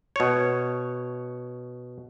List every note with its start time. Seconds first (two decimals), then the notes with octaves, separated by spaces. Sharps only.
0.16 B2 C#5